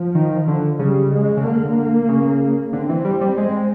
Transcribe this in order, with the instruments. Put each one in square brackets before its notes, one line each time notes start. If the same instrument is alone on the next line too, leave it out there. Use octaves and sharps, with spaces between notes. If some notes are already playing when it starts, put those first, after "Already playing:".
Already playing: [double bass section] F3
[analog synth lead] D#3
D3
[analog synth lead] C#3 [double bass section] G3
[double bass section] G#3
[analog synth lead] C#3
[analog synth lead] D3 [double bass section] A#3
[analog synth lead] C#3
[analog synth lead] D3 [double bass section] C4
[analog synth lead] E3
G3
G3
G#3